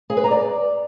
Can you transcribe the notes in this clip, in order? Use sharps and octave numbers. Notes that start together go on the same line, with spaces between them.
G#4
B4
A#5
D5